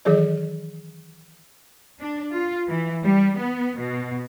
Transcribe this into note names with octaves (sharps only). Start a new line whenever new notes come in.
D#3 E3 F#3 G#4 A4 D#5
D4
F4
E3
G3
B3
B2